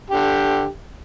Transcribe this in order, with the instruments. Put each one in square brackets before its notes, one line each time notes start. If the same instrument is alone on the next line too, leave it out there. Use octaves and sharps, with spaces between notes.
[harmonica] D3 G4